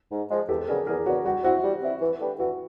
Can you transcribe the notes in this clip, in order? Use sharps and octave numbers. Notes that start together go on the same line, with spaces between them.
G#2
F3 G#3
E2 G4 A4
C#3 F#3 B3 D4 G#4 A#4
E2 G#4 A#4
C#3 F#3 B3 D4 F#4
G3 F#4
C4 E4 F#4
G3
C4 E4
E3
A3 D4 G4 B4
E3 F#4